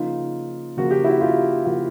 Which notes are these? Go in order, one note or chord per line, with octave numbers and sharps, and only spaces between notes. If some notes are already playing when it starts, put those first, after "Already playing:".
Already playing: C#3 F3 A#3 D#4 F4
C#3 F3 A#3 F#4
G4
E4 F#4
F4 G4
C#3 F3 A#3 E4 F#4